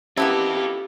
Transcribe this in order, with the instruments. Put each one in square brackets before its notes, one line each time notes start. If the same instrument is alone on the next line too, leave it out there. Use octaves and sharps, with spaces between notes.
[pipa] A#3 B3 E4 [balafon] C#4 [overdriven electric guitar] F4 A4 [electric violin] G4